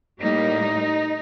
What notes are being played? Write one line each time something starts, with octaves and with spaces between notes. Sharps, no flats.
A2 G3 A#3 D#4